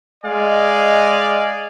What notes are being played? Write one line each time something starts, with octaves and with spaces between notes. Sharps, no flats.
G#3 D5 D#5 F5 G#5